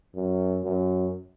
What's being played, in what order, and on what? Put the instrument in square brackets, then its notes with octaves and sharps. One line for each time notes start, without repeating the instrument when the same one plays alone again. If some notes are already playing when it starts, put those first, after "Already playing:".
[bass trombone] F#2
F#2